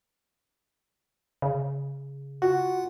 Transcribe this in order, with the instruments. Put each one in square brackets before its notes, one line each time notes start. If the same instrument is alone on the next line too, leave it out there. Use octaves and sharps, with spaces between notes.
[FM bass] C#3
[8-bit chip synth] F4 F#5 [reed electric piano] F#4